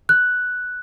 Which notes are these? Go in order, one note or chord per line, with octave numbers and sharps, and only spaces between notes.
F#6